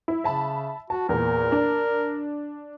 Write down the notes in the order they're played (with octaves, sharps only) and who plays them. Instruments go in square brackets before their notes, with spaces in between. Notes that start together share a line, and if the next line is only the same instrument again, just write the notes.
[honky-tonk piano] E4
[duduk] C#3 [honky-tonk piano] E5 A5 B5
[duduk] F#4 [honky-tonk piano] A5
[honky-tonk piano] E2 A#2 [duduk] A#4
[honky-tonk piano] D4